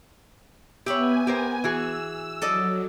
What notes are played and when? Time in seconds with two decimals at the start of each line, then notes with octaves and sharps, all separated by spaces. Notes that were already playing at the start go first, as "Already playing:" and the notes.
0.86 B3 G4 C#5 E5 G#5 B5
1.27 G4 A#4 C5
1.64 E3 F#4 G#4 E6
2.42 F#3 A4 D5 D#5